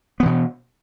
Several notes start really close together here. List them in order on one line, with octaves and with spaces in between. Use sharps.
B3 E3 B2